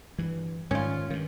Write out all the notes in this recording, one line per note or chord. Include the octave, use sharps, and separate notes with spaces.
G2 E3
G#2 D#3 G3 C#4 F4
G2 D#3